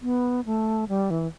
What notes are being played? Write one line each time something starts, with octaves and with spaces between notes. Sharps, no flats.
B3
A3
G3
E3